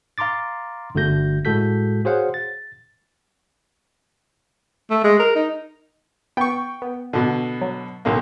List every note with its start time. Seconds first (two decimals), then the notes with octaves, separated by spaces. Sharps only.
0.18 F5 A#5 C6 D6 A6
0.95 G1 D3 A3 F#4 G6 A#6
1.45 A2 G#3 F#4 A4 G6 B6
2.05 F#4 G#4 C5 C#5 F5 F#5
2.34 A6
4.90 A3
5.04 G#3
5.20 A#4
5.36 D#4
6.37 B3 G5 C#6
6.82 B3
7.13 B2 D3
7.61 F#3
8.05 B1 D3 A#3